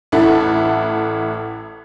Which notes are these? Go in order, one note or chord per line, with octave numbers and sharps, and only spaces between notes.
A1 E4 A4 F#5